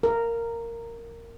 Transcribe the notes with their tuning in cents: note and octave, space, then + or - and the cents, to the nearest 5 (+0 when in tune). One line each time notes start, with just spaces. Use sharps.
A#4 -10